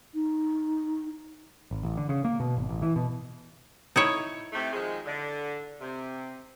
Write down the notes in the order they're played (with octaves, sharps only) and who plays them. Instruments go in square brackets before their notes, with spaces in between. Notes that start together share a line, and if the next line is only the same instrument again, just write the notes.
[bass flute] D#4
[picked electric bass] G#1
A1
D3
C#3
A#3
B2
G#1
A1
E3
B2
[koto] D#4 E4 C#5
[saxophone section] C3 A3
D#3 F3 G#3
D3
C3